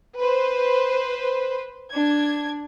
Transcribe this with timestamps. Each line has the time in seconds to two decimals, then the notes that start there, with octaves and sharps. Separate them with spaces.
0.17 B4 C5
1.92 D4 G#6